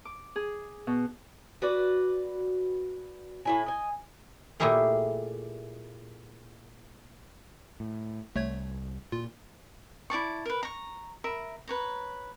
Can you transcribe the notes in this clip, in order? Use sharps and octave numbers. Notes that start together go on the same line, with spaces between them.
D6
G#4
B2
F#4 B4 D5
A2 E4 G#5
D#5 G#5
A#2 A3 E4 G4 G#4 A#4
A2
C2 G3 A3 C#5 G#6
A#2 F4
E4 D5 A5 C#6
A#4 B4
A#5 C#6
A#4 E5 B5
B4 C#5 A#5